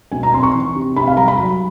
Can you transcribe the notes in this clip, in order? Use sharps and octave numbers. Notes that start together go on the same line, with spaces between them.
B2 G#5
A#5
C4 C6
C#6
E3
C3
C3 B5
F5
G3 A#5
B5
F#3